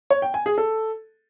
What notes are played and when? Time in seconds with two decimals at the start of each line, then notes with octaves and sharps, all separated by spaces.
0.10 C#5
0.22 G5
0.34 G#5
0.46 G#4
0.58 A4